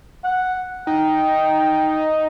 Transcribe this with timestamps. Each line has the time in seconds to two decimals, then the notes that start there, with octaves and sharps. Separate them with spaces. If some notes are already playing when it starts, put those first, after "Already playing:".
0.24 F#5
0.87 D#4 G5